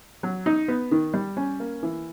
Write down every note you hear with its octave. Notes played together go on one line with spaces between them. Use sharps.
F#3
D#4
B3
D#3
G3
C#4
A#3
E3